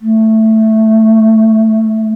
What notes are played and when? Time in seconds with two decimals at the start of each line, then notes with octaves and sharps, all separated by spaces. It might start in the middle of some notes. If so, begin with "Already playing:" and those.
0.01 A3